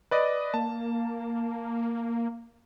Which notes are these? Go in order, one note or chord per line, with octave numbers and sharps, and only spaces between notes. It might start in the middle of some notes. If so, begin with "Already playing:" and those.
B4 D5 D#5
A#3 A5